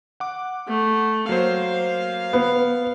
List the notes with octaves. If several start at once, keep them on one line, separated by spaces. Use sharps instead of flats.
F#5 D6
A3
F#3 A#3 C5 F5
B3